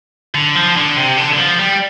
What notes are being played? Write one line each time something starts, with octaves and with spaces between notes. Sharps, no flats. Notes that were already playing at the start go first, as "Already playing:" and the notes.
D3
F3
D3
C3
D3
D3
F3
G3